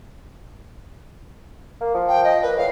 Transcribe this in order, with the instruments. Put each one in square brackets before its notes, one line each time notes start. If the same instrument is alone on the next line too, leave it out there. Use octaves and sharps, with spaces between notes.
[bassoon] A#3
F3
[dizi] G5
D#5
[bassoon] A#2 [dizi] B4
[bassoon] A2 [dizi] F5